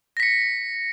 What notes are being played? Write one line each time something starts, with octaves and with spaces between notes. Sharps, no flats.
A#6 B6 C#7